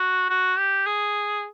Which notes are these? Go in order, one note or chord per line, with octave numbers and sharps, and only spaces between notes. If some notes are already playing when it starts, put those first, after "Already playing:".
Already playing: F#4
F#4
G4
G#4